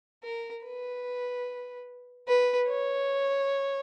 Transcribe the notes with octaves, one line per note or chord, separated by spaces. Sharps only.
A#4
B4
B4
C#5